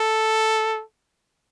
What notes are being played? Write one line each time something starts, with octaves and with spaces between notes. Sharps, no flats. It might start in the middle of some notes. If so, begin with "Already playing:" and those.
Already playing: A4